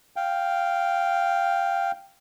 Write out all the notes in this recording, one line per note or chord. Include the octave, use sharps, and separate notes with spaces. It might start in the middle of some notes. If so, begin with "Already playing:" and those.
F5 G5